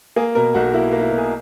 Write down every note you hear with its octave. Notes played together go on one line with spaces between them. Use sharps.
A#3 G#4
B2 A#4
B1 F#4
A#3 E4
A#3
E4
B2
G#4